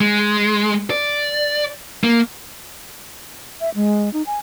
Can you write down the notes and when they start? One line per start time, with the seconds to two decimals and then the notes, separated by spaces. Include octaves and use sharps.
0.01 G#3
0.90 D5
2.04 A#3
3.61 E5
3.75 G#3
4.13 D#4
4.26 G#5